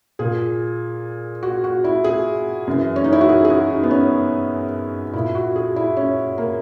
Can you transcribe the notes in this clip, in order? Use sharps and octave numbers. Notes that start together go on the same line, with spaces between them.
A#2 G#4
F#4
F#4
E4
G#4
F#2 E3
C#4
D#4
E4
F#4
G#4
G#4
F#4
D#4
B3
C#4
A#2 E4
F#4
G#4
E4
C#4
A#3